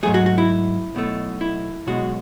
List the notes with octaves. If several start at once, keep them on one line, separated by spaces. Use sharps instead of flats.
G#2 F#3 A3 G#4
F#4
F#4
E4
B1 B2 A3
E4
B1 B2 G#3 F#4